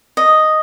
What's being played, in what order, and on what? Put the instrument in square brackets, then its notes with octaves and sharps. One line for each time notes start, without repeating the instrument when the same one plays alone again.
[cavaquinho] D#5